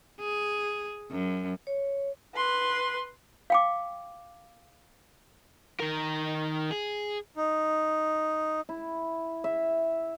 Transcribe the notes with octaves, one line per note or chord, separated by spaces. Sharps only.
G#4
F#2
C#5
B4 C6
F5 G5 D6
D#3 A#4
G#4
D#4
E4
E5